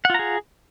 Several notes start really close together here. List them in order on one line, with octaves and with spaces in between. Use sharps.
F#5 F4 A#5 G#4